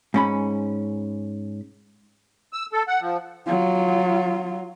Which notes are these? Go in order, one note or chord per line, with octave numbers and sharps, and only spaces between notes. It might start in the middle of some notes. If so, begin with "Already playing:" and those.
G#2 C#4 B5
E6
A4
F#5
F3
F#3 F4